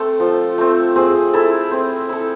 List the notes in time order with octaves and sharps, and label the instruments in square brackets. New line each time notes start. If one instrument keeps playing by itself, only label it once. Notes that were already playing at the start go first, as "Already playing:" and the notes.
Already playing: [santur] A3 C4 [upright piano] A4
[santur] F3
A3 C4
[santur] C4 [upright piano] G#4
[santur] E4 A4
C4
E4 A4